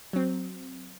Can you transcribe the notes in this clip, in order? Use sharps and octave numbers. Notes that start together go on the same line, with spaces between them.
F#3 C4